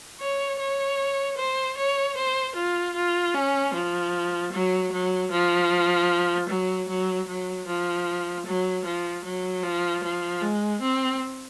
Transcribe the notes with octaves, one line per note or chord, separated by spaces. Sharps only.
C#5
C#5
C5
C#5
C5
F4
F4
C#4
F3
F#3
F#3
F3
F#3
F#3
F#3
F3
F#3
F3
F#3
F3
F3
G#3
C4